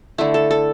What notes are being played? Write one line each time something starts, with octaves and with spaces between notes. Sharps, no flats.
D3 A3 E4
A4
A4